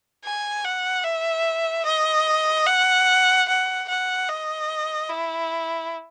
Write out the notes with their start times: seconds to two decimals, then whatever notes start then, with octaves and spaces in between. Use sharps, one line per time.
0.25 G#5
0.64 F#5
1.04 E5
1.85 D#5
2.66 F#5
3.48 F#5
3.88 F#5
4.29 D#5
5.09 E4